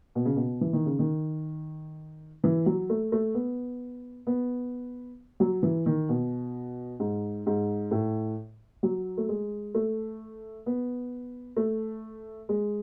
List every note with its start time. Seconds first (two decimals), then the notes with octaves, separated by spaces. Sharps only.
0.15 B2
0.25 C#3
0.36 B2
0.61 E3
0.73 D#3
0.86 C#3
0.99 D#3
2.44 E3
2.66 F#3
2.90 A3
3.12 A3
3.34 B3
4.27 B3
5.40 F#3
5.63 E3
5.86 D#3
6.09 B2
7.00 G#2
7.46 G#2
7.91 A2
8.83 F#3
9.18 A3
9.29 G#3
9.75 A3
10.66 B3
11.57 A3
12.49 G#3